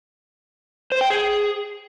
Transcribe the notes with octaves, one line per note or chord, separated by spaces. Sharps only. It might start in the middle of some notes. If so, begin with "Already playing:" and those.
C5
G5
G#4